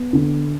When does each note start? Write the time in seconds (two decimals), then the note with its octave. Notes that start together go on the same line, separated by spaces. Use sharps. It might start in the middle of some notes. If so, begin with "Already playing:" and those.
Already playing: B3
0.13 D3